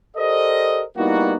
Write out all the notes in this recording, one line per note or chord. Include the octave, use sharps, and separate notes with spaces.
G4 A4 A#4 C5 D5 D#5
G3 A#3 B3 D#4 E4 F#4